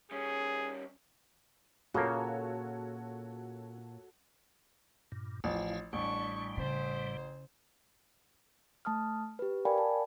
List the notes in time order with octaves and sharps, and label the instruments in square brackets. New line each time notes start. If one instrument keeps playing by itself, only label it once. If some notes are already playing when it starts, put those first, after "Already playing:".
[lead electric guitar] G3 C#4 [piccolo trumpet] G#4
[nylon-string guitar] A#2 [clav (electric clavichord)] C#3 A#3 [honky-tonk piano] F#4 A4 C#5
[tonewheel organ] G2 A#2
[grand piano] A1 F3 [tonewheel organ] E4 F5
[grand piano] A1 [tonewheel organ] A2 G3 [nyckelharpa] D4 C#6
[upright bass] C#3 [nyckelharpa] C5
[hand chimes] A3 A5 D#6 F6
G4 B4
A#4 D5 F5 G5 G#5 B5
A5